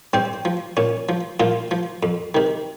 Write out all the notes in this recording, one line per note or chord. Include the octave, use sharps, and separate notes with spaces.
G2 C4 C5
F3
A#2 C#4
F3
A#2 F3 F4
F3
F2
C3 D#3